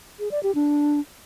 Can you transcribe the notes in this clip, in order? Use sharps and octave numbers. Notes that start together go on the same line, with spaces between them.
G#4
D5
G4
D4